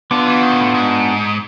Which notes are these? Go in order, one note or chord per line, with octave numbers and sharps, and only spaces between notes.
D3 B3 D4 F4
E3
D#3
A#2
A2
G#2